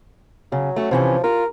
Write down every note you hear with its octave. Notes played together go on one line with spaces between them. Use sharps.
C#3 F#3
A3 C#4 F#4
C3 E3 F3 C#4
F4 A#4